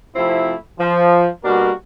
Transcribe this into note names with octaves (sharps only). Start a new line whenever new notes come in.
C3 F3 A3 C4 E4
F3
B2 G3 A#3 D4 F#4 A#4